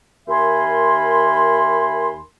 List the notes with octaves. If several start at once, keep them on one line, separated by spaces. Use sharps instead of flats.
D#2 A#4 E5 G#5 B5 C6